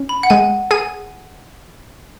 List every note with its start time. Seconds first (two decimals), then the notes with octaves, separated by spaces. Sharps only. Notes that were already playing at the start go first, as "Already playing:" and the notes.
Already playing: C#4
0.09 B5
0.23 F#5
0.30 G#3 G#5
0.71 G#4 G#5